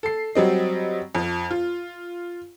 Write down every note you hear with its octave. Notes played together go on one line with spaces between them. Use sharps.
A4 C7
F#3 G3 C4 D#5
F2 F3
F4